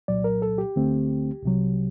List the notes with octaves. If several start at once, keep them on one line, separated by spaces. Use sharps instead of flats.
C2 A#2 F#3 D5
A#4
A4
G4
D2 D3 A3 C4
C2 C3 F#3